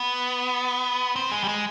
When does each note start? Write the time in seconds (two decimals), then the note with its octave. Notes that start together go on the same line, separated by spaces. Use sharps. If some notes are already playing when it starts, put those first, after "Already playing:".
Already playing: B3
1.16 C4
1.31 G#3
1.44 G3
1.49 G#3